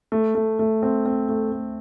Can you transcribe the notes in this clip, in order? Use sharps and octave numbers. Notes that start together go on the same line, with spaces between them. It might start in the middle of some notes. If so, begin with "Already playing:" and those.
A3
A3
A3
C4
C4
A3
A3